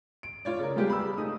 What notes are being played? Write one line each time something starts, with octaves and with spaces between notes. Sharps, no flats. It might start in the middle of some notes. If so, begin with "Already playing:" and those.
D7
F4 C#5 D5
C#3 A#4
G3 G#3 B3 F4 G4 G#4
B5 E6
A3 D#4 D#6